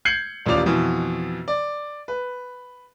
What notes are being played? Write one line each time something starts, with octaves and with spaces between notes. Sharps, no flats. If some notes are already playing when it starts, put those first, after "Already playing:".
G6 G#6 C7 C#7 F#7
D#1 A1 D#2 F4 D5 F7
F2 B2 E3
D5
B4